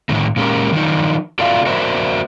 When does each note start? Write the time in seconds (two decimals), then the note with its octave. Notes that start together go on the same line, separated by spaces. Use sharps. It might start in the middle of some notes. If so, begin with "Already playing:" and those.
0.09 A2 D3 D#3 A3
0.36 A#2 G#3 A#3 C#4 G4 A#4
0.72 D#3 F3 F#3 D4 D#4
1.39 F4 F#4 A4 D5 E5 F5
1.66 F#4 A#4 C5 D5 E5